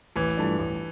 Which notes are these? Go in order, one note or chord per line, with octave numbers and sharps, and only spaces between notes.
A1 E3
G2 F3 A3 D4
A1